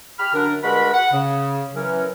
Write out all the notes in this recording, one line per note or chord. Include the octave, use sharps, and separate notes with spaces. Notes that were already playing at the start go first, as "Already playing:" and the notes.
G4 B5 F6
F#2 D3 D4 A#4
G2 G#3 F#4 A#4 F#5 B5
F#5
C#3
E3 F#3 C#4 A#4